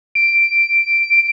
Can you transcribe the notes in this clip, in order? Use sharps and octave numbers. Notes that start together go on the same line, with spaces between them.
D7